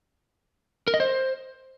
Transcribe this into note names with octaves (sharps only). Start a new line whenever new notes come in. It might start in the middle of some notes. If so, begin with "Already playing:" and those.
A#4
D#5
C5